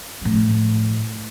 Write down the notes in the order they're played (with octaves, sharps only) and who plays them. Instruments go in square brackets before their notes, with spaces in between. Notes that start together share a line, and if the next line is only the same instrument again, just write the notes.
[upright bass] A2 F3